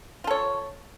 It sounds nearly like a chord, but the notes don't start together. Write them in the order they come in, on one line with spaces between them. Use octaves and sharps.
F4 A4 C#5